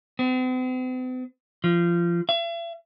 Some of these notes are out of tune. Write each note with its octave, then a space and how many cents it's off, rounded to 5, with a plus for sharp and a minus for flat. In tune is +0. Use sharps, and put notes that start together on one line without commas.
C4 -45
F3 -25
E5 +45